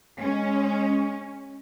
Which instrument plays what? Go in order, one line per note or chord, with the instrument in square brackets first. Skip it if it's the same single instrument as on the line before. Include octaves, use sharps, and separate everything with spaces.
[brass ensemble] G#3 [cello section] C#4